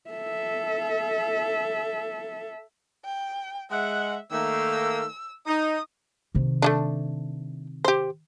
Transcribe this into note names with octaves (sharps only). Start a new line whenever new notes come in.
A4 E5
G5
G#3 E5 F#5
D#3 A3 A#3 E6
D#4 D#6
C3 D#3
A3 C#4 D4
G4 C5